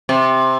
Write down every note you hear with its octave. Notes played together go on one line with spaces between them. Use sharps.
C3